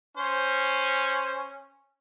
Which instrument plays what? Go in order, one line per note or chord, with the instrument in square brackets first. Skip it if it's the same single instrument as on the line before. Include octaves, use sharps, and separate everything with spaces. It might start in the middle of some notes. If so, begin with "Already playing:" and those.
[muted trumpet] C#4 [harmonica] C5